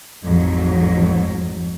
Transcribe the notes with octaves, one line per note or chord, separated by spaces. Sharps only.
A1 F2 G#2 F#3